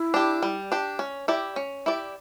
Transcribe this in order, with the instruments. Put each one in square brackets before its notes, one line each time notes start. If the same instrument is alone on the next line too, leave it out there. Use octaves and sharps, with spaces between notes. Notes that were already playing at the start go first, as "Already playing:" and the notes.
Already playing: [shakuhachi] E4
[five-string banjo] D4 G4
G3
D4 G4
C#4
E4 G4 D5
C#4
E4 G4 D5